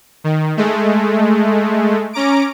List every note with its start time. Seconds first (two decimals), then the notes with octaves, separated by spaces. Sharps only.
0.24 D#3
0.57 G#3 A3
2.13 C#4 A#5 D6 D7